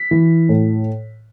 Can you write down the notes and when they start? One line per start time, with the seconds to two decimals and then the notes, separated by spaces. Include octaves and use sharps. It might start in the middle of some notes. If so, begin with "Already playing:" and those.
Already playing: B6
0.11 E3
0.49 A2